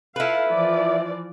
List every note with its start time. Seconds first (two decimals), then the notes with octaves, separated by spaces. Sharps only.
0.16 E4 F4 A4 B4 F5
0.50 E3 F3 D5